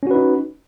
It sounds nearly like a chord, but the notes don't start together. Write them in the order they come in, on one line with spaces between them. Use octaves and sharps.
C#4 F#4 B4 D#4